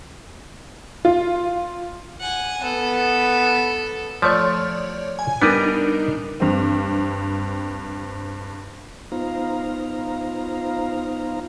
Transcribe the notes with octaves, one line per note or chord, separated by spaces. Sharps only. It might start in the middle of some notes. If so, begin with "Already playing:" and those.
F4
F#5 G#5
B3 A4
F3 A3 C#5 D5
G#5
G3 B3 D4 D#4 A#4
G2 C4
B3 D#4 F4 C5 F5 A#5